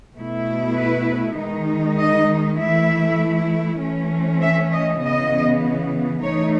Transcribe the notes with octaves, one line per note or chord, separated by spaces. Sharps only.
B2 A3 E4
B4
D#3 G#3 D#4
D#5
E3 A3 E4 E5
E3 A3 C#4
E5
D#5
C#3 E3 B3 D#5
E3 A3 D#4 C#5